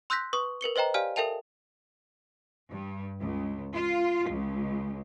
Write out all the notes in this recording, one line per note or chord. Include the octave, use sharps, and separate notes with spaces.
C6 E6 F#6 G6 A#6 B6
B4 C#6 D#6
A#4 B4 C#7 G7
B4 C5 D#5 G5 A#5
G4 D5 F5 G#5 F6
A4 A#4 E5 G5 A5 F7
G2
C#2
F4
C#2